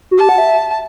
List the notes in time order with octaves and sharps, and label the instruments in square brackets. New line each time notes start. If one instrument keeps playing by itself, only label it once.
[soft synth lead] F#4
[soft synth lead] G4 [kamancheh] A5
[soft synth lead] F#5
E5